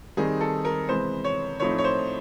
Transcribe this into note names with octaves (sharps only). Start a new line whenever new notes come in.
D#3 G3 C4 D#4 G#4
A4
A#4
C3 E3 G#3 B3 C5
C#5
A2 F3 A3 C4 D#4 C#5
C#5
C5